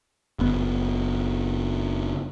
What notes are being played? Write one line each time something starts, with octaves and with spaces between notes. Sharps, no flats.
F#1 B3